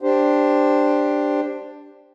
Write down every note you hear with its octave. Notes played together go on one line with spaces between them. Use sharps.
D4 G4 C5